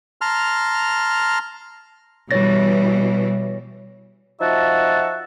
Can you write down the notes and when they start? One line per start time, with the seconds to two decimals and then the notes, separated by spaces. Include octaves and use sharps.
0.21 A5 A#5 C6 F6
2.31 B2 E3 G3 C#5 A6 A#6
4.41 F3 D#4 F#4 E5 F#5 A5